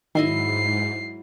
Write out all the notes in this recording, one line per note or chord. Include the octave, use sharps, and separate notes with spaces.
G#2 D#3 F#3 E4 D#5 C7